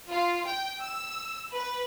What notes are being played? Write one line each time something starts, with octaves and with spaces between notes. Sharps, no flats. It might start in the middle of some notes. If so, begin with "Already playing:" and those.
F4
G5
E6
B4